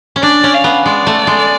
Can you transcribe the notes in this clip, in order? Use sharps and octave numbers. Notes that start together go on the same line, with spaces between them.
C#4
D4 D5
C#4
F5
B3
G#3 D5
A3
G#3